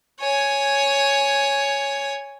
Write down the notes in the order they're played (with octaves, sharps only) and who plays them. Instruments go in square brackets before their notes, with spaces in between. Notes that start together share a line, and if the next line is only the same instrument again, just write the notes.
[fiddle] C#5 G#5